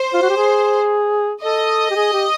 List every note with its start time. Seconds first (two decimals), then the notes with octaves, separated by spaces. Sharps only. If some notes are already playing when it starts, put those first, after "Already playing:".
Already playing: C5
0.14 F4
0.22 F#4
0.29 G4
0.37 G#4
1.42 A4 D#5
1.90 G4
1.95 G#4
2.13 G4